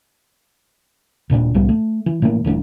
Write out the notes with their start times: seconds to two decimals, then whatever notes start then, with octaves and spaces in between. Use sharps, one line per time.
1.30 D#1 A#2 B3 D4
1.54 C2 A2 G3 B3
1.69 A3
2.06 E3
2.22 A2 E3 A3 A#3
2.44 D#1 E3 A3 D4